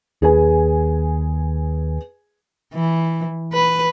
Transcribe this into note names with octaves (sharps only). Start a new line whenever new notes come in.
D#2 G#4 B4 G#5
E3
B4